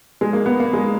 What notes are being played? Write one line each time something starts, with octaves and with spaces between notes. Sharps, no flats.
G#3
A#3
B3
A#3
G#3